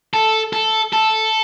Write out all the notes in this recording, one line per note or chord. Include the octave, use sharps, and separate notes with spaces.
A4
A4
A4